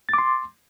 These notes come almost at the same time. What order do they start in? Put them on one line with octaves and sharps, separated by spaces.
A6 D6 C6